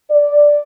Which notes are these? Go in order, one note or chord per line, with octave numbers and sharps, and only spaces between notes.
D5